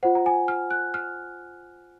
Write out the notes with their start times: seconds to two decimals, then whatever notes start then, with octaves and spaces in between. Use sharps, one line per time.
0.03 F4 C5 F#5
0.15 A#5
0.26 G#5
0.48 F6
0.71 F#6
0.94 F6